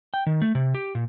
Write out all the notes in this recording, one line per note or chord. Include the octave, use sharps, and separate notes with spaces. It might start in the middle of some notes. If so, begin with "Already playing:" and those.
G5
D#3
A3
C3
G4
A#2